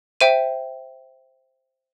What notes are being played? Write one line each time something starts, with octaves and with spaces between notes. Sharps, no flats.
C5 E5 G5 D#7